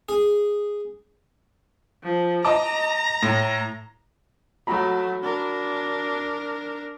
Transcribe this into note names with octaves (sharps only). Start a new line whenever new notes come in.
G#4
F3
D#5 A5 A#5 D6
A2
F#3 A3 F#4 A#5 B5
D4 A#4